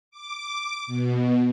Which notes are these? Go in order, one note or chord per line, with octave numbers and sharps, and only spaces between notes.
D6
B2